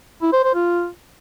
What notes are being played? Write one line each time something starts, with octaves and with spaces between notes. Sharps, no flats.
E4
C5
C5
F4